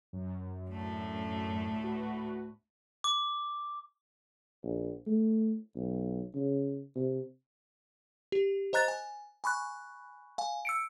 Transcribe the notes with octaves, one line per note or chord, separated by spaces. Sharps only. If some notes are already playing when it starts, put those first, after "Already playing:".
F#2
D2 A2 A3
F#4 B4
D6
A#1
A3
B1
C#3
C3
G4
C5 D#5 A#5 F#6 A6
G#5
G#5 B5 C#6 F#6
F5 G#5
E6 C#7 D7